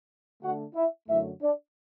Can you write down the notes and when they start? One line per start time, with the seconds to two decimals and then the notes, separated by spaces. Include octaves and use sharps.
0.42 D3 A3 D4 F#4 F#5
0.75 E4 E5
1.08 F#2 D3 F#3 A3 E4 E5
1.41 D4 D5